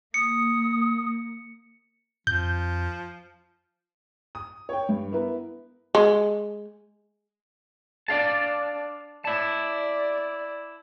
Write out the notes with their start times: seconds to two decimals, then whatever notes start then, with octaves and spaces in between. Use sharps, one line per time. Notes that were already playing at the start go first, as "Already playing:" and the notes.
0.14 A#3 D#6 C#7
2.27 F2 F3 G6
4.35 D#6
4.69 C#5 G5
4.89 G2
5.12 B3 E4 A#4 B4
5.95 G#3
8.08 D4 D5 F5 A5
9.25 E4 D5 A5